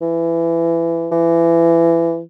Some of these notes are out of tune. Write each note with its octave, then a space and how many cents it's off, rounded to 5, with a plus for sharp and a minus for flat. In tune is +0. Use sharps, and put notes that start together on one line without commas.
E3 +20
E3 +25